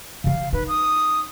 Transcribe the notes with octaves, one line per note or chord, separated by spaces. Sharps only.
C3 E3 F5
D#4 B4
D#6